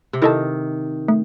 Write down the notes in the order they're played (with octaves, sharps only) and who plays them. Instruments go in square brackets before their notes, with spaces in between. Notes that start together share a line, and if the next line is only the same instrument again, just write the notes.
[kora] C3
[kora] D#3 [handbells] E4 A4 D#5 A5
[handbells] A3